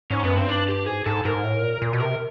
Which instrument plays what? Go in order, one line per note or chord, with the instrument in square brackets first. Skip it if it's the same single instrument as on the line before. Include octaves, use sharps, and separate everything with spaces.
[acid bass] G#2 [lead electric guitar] C#4
[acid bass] F#2 [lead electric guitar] B3
[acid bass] G2 [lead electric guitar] C4
[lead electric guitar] D4
G4
[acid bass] G#2 [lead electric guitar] G#4
[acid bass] G#2 [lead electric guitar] A4
[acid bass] G#2 [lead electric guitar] A#4
[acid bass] A2
A#2
A#2
B2
[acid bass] C3 [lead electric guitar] A#4